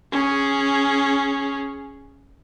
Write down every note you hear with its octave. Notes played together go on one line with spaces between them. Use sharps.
C#4 G#4